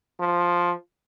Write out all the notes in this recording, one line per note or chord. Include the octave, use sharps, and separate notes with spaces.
F3